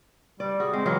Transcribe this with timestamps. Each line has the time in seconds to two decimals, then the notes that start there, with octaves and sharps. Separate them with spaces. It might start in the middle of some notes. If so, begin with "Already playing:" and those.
0.40 G3 D5
0.60 F#4 G#4
0.73 G#3 C4
0.86 E3 F#3 F4